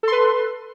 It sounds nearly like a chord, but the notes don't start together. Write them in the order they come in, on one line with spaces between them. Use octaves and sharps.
A4 C6 B4